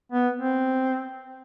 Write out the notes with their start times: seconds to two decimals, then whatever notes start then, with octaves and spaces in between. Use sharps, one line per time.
0.12 B3
0.36 C4